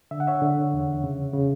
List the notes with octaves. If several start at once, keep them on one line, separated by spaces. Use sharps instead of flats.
D3 E5
F#5
C#5 E5
D3
E2
C#3
C#3